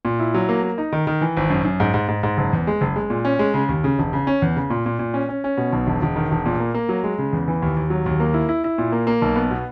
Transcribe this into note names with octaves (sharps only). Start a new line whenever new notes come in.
A#2
E4
F#3
A#3
A#3
D#4
D#3
D#3
E3
G#1
F#2
F#2
G#2
G#2
G#2
G#2
F#1
E2
G#3
F#1
G#3
A#2
C#4
G#3
C#3
D#2
C#3
E1
C#3
C#4
E2
C#3
A#2
A#2
A#2
C#4
C#4
C#4
B2
B1
E1
E1
D#3
E1
A#2
A#3
A#3
F#3
G#3
C#3
E2
E3
D#2
D#2
F#3
D#2
A#3
E4
E4
E4
A#2
A#3
A#3
B1
B3
B2